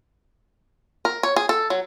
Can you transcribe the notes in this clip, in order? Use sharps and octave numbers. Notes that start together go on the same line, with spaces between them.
A#4
C#5
G#4
A4
F#3